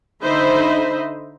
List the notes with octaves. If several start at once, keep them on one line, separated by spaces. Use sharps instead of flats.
D3 D#4 C5 D#5 E5 B5